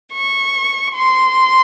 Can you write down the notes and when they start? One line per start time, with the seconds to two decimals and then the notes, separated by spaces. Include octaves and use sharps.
0.13 C#6
0.94 C6